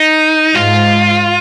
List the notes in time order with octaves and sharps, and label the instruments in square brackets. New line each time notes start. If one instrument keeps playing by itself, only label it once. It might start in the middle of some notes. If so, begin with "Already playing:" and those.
Already playing: [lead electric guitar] D#4
[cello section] G#2 [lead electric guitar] F4